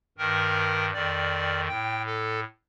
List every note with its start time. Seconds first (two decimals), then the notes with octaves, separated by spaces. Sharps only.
0.18 G2 D#3 A#4
0.93 F2 D#3 D5
1.68 A2 G5
2.06 A4